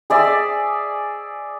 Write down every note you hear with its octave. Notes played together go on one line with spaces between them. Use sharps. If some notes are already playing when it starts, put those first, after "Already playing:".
G#4 D5 E5